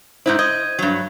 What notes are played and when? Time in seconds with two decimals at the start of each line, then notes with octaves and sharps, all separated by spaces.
0.26 G#2 D#4 E4 C5 G6
0.39 D#5 G#6
0.79 G2 F#3